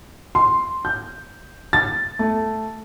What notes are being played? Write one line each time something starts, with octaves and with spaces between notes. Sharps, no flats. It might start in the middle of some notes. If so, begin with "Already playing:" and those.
C6
G6
A6
A3